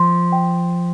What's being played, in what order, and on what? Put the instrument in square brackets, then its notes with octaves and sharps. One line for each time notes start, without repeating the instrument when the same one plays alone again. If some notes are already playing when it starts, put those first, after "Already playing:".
Already playing: [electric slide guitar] F3 [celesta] C6
[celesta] G5